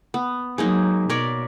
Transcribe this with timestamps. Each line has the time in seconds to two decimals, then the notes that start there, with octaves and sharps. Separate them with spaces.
0.14 B3
0.58 F#3 G#3 A#3 D#4
1.10 B2 A#4 C#5 D5